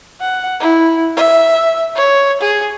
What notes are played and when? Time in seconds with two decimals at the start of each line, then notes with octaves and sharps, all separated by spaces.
0.20 F#5
0.60 E4
1.17 E5
1.96 C#5
2.41 G#4